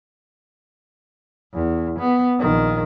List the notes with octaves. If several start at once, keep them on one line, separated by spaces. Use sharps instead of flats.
E2
B3
A#1 D#3